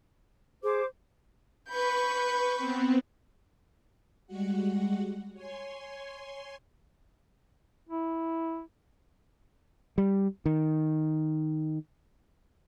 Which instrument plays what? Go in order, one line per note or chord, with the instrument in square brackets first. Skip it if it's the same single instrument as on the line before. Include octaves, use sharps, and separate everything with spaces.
[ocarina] G#4 [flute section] C5 D6
[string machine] B4 C#6 [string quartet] B5 G6
[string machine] B3 C4
G3 G#3 F#4 F#5
C#5 G#5 C6
[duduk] E4
[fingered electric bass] G3
D#3